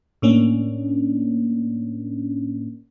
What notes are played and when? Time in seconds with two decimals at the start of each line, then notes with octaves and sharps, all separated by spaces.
0.22 A2 A#3 C#4 D4